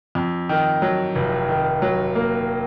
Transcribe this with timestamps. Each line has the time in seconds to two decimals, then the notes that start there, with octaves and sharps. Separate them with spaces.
0.15 F2
0.49 D#3
0.82 F#3
1.15 F1
1.49 D#3
1.82 F#3
2.15 A#3